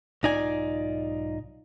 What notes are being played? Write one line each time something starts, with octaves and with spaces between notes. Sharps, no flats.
B1 G#2 D#4 F4 D5 G#5